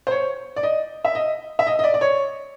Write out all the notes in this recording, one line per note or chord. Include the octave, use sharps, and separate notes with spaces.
C5
C#5
D5
D#5
E5
D#5
E5
D#5
D#5
D5
D5
C#5